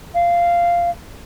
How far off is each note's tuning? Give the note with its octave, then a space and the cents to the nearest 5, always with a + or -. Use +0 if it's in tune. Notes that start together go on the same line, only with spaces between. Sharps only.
F5 -10